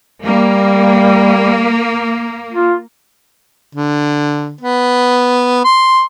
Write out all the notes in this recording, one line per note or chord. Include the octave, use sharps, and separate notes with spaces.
G3 A#3
F4
D3
B3
C6